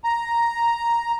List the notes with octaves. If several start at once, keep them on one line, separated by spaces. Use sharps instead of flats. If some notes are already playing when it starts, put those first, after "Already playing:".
A#5